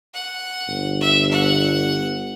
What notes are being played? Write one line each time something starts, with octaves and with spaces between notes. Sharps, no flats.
F#5
G1
E5
F#5